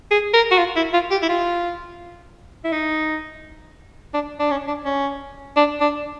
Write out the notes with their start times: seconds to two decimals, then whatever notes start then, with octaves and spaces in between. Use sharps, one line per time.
0.11 G#4
0.34 A#4
0.51 F#4
0.58 F4
0.76 E4
0.94 F4
1.11 G4
1.23 E4
1.29 F4
2.65 E4
2.73 D#4
4.14 D4
4.39 D4
4.51 C#4
4.67 D4
4.85 C#4
5.57 D4
5.81 D4